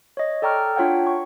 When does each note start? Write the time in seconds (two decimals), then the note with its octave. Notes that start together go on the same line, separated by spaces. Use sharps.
0.17 C#5 D#5
0.42 A4 D5 G5 A#5 C#6 F6
0.76 D4 F4 C#5 F#5 G5
1.07 C#6